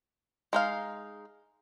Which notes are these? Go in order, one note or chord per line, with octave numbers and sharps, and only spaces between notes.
G#3 D#4 F5